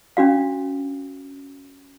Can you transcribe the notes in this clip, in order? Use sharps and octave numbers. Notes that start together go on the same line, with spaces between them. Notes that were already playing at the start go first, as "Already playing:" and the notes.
C#4 D4 F#4 F5